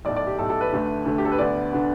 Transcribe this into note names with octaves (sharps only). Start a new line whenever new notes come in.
B1 A2 A3 D5
D5
G4
B1 A2 A3 A4
A4
B4
D2 D3 A3
D2 D3 A3
G4
A4
B4
D2 D3 B3 D5
D3 B3